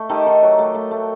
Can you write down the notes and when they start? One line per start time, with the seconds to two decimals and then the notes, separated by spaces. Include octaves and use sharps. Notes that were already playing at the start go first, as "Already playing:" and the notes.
Already playing: A3
0.09 D#3 G4 A4
0.27 D#3
0.42 F#3
0.59 A3
0.74 A3
0.91 A3